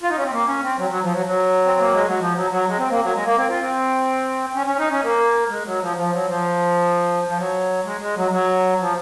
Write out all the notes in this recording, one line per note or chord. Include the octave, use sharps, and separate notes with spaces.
F4
D#4
C#4
C4
A#3
C#4
C4
F#3
F#3
F3
F#3
F#3
C4
A#3
G#3
F#3
F3
F#3
F#3
G#3
C4
A#3
F#3
G#3
A#3
C4
F4
C4
C#4
C#4
D#4
C#4
A#3
G#3
F#3
F3
F3
F#3
F3
F3
F#3
G#3
G#3
F#3
F#3
F3